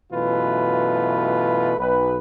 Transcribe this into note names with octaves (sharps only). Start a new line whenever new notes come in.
F#2 B2 E3 A3 F4 B4
B1 B4